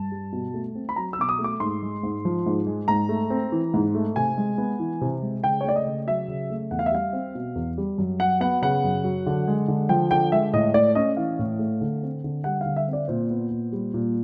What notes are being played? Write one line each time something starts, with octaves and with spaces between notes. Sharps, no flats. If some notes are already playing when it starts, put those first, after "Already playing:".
Already playing: G2 A5
G3
B2
A3
C4
B5
F#3 A#5
E6
B2 D6
D#6
A3
D6
G#2 C6
G#3
G#2
F3
G#2
G#3
G#2 A#5
A3
C4
E3
G#2
A3
C3 G#5
G#3
B3
E3
C3
G#3
C#3 G5
C#5
A3 D5
D#5
C#3
F#3 E5
C#3
A3
E2 F#5
F5
E5
G3 F5
C4
B2
E2
G3
F#2
F#3 F#5
B3 F#5
C#3 F#5
F#2
F#3
D3
G#3
D3
F3 G5
D3 G5
G#3 E5
A2 D#5
A3 D5
C#4 D#5
E3 F5
A2
A3
D3
C4
D3
G3 F#5
D3 F5
E5
C4
D5
A#2 C5
B3
A#2
G3
A#2